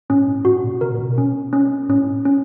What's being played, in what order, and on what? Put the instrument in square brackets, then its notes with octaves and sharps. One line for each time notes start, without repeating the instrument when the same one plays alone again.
[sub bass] A2 [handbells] C#4
[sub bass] A2
[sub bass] A2 [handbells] F#4
[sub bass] A#2
[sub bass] C3 [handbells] A#4
[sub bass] A#2
B2
[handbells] C#4
C#4
[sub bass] A2 [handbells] C#4
[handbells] C#4